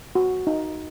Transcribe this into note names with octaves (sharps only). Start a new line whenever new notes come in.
F#4
D#4